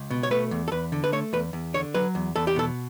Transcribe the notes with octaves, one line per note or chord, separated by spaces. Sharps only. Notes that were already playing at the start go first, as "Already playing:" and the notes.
Already playing: C#2
B2
C#5
A3 B4
E2
A4
E2 B4
D3
B4
A3 C#5
E2 B4
E2
D3 C#5
F#3 B4
E2
E2 A4
G4
B2 A4